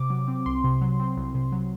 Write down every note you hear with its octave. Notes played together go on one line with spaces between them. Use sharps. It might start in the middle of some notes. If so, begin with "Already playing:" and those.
Already playing: C3 D6
F#3
C4
C2 C6
C3
F#3
C4
C2
C3
F#3